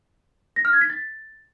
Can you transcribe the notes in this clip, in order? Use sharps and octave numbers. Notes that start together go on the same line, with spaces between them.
A#6
F6
G#6
B6
A6